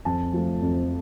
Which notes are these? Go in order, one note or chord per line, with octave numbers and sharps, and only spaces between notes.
F2 A5
F3 A3
F2